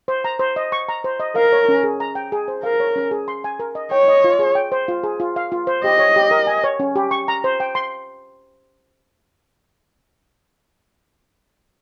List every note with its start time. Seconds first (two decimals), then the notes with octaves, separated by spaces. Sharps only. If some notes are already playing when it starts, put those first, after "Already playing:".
0.08 C5
0.24 A#5
0.39 C5
0.56 D#5
0.72 C#6
0.89 A#5
1.04 C5
1.20 D#5
1.36 A#4 F5
1.52 C#5
1.68 C#4
1.83 G#4
2.00 A#5
2.15 G5
2.32 G#4
2.48 C5
2.63 A#4 F5
2.80 C#5
2.96 C#4
3.11 G#4
3.28 C6
3.44 G#5
3.59 A#4
3.75 D#5
3.91 C#5 G5
4.08 D#5
4.24 F4
4.39 G#4
4.55 G5
4.72 C5
4.88 F4
5.04 G#4
5.20 F4
5.36 F5
5.52 F4
5.67 C5
5.84 G4 D#5
5.99 C#5
6.16 G4
6.31 A#4
6.47 G#5
6.64 C#5
6.80 C#4
6.96 G4
7.11 C#6
7.28 A#5
7.44 C5
7.60 G5
7.75 C6